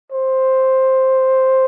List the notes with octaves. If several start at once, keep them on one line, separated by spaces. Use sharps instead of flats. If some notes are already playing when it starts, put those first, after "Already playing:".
C5